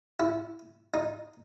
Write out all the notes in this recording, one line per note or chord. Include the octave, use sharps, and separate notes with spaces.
E4
D#4